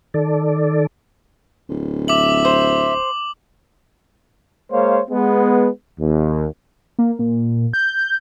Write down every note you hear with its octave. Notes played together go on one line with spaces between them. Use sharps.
D#3 A4 D5
D1
E5 D6 F#7
C5
G#3 A#3 C5 C#5 F5
G#3 B3
D#2
A#3
A#2
G6